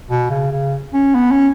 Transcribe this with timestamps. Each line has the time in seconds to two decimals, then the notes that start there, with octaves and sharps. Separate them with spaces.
0.10 B2
0.30 C#3
0.52 C#3
0.94 C#4
1.15 B3
1.32 C#4